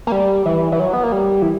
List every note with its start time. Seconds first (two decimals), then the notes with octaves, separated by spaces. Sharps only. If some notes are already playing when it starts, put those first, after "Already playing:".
0.07 A#3
0.12 G3
0.46 E3
0.72 E3
0.79 F#3
0.93 B3
1.03 A#3
1.12 G3
1.42 E3